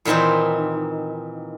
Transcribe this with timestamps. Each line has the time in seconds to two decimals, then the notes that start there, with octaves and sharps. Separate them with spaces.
0.05 A#2 D#3 E3 C4 D#4